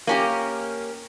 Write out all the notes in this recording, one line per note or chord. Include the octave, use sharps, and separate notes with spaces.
A#3 C#4 G4